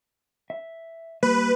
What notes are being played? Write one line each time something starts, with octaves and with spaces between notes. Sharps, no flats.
E5
G3 A#3 B4